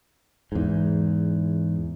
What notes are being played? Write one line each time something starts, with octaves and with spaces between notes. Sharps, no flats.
E2 G#2